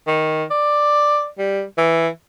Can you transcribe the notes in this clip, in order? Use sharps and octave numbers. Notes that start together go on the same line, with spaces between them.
D#3
D5
G3
E3